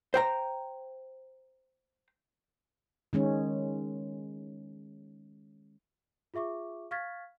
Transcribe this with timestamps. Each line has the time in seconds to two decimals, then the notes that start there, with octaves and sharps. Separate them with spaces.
0.14 C5 G5 A#5
3.13 D#3 G#3 C#4
6.34 F4 G#4 E5 C#6 D6
6.91 F5 C#6 F6 G#6 A6 B6